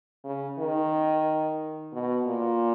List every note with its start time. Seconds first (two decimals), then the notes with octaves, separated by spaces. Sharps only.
0.25 C#3
0.58 D#3
1.93 B2
2.26 A#2